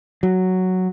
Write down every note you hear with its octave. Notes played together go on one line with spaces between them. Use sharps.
F#3